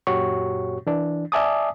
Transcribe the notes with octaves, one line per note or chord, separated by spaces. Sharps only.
F#2 A#2 F#4 G4 C#5 C#6
E3 D4
D5 E5 G#5 A5 D6 D#6